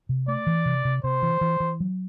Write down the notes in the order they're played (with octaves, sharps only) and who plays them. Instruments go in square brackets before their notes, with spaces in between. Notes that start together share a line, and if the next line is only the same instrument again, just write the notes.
[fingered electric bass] C3
[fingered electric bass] A3 [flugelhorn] D5
[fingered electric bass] E3
C3
C3
[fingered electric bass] C3 [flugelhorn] C5
[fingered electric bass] E3
E3
E3
F#3